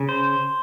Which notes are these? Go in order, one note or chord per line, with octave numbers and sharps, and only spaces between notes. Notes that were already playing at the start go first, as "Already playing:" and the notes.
Already playing: C#3
C5